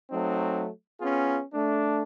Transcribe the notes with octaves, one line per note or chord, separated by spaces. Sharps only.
F#3 A3 C4 D#4
B3 C#4 F4 G#4
A3 D4